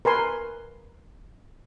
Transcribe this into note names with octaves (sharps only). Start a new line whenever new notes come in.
A#4 B4 G#5 C6